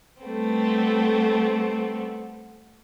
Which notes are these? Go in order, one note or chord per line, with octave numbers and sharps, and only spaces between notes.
G3 A3 B3 C4